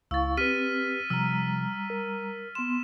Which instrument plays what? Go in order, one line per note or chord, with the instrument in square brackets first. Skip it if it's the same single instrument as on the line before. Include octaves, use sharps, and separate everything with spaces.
[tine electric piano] C#2 [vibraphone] E4 F5 C#6 [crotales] E6 A6
[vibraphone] C4 [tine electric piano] G4 B4 [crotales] F6 B6 D#7
[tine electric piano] C3 F3 [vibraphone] G3 A#5 [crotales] E6
[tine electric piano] A#4
[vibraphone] B3 C6 [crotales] E7